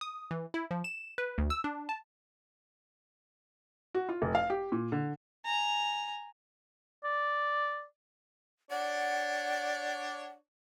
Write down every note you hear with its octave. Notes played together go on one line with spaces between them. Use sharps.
D#6
E3
E4
F3
E7
B4
D2
E6
D4
A5
F#4
F4
F1
F5
G4
A#2
D3
G#5 A#5
D5
D4 C#5 D5 F#5